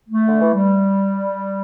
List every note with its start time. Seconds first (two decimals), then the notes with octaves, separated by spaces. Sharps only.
0.08 A3
0.28 D3
0.41 E3
0.54 G3